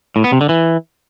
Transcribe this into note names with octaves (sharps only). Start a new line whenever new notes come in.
A2
B3
C3
D3
E3